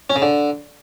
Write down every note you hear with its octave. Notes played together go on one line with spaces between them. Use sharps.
C#4
C#3
D3